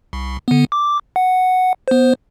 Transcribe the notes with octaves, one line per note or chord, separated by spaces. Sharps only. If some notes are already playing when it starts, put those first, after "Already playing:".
C2
D3 B3
D6
F#5
B3 C5